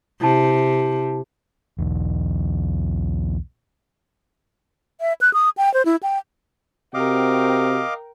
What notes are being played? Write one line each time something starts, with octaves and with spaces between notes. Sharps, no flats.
C3 E4 A5
B1 E2
E5
F#6
D#6
G5
C5
E4
G5
C3 C4 F#4 A#4 D#5 F5 G5 D6